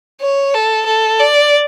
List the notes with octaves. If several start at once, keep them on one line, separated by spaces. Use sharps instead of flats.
C#5
A4
A4
D5